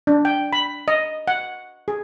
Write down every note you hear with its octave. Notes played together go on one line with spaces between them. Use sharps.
D4
G5
B5
D#5
F#5
G#4